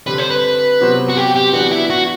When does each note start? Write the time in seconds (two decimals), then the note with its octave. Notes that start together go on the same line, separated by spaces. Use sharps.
0.07 D3 G3 C4 B4
0.18 C5
0.31 B4
0.80 C3 F#3 B3 F#4 C5
1.09 F#4
1.17 G4
1.35 G4
1.53 E3 B3 D4 F#4 G4
1.71 E4
1.90 F#4